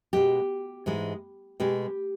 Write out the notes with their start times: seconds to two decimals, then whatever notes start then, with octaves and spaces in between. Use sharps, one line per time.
0.13 B2 G#3 G4
0.86 G#2 E3 G#3
1.60 B2 G#3 G4